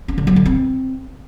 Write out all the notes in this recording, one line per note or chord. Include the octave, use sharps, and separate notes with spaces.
C#4
D3
F#3
D3
C4